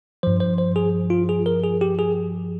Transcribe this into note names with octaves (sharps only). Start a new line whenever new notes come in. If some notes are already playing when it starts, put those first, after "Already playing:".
G2 F3 C5
C5
C5
G#4
F4
G#4
A#4
G#4
G4
G#4